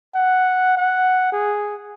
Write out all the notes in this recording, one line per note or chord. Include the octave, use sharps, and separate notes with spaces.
F#5
F#5
G#4